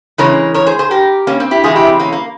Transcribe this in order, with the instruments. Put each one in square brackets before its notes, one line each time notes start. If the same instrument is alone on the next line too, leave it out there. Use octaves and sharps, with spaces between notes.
[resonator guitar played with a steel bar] C#3 E3 G#3 A#4 C#5
A#4 C#5
G#4 C5
G#4 C5
G4 A#4
A#3 C#4
C4
E4 G4
C3 E3 G#3 F4 G#4
E4 G4
C4
A#3 C#4
A#3